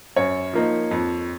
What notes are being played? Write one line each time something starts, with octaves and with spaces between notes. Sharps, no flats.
F#2 C#5
F3 A#3 D#4
F2